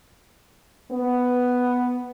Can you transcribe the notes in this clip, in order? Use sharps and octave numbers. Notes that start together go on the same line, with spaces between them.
B3